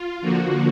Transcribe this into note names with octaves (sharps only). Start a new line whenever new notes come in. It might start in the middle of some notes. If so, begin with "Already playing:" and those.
Already playing: F4
D3 F3 A#3 F#4